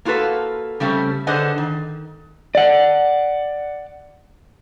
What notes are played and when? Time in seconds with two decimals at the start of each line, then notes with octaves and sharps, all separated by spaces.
0.05 A#3 F4 F#4 A4 B4
0.80 C#3 G3 A3 C4 C#4
1.27 D3 G#4 B4 C5 D#5 F#5
1.58 D#3
2.55 D5 F#5